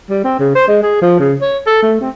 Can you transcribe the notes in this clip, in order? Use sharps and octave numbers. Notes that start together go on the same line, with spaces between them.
G3
C4
C#3
C5
G#3
G#4
F3
C#3
C#5
A4
A3
C4